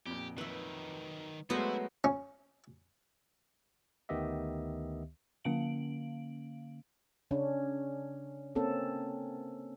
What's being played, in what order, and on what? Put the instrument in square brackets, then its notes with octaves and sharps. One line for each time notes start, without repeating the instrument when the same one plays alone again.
[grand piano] F2 A#2 [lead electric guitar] G4
[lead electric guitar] D#3 F#3 [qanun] B4 E5
[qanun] F#3 C5 [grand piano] G#3 A3 [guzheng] B3 [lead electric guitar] E4
[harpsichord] C#4
[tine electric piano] D2 D#3 B3 G4 D#5 E5
[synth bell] D3 A#3 C#4 F5 D7 F#7
[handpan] C#3 C#4 D4
A#3 C4 C#4 A4